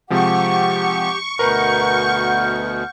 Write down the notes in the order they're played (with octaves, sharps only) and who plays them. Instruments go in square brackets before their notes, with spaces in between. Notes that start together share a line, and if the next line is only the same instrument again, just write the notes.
[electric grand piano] C3 F3 G#3 [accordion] G4 [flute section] F#5 [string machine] C#6
[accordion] D2 B2 [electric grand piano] A#4 B4 A#5 [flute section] F#5 F6 G6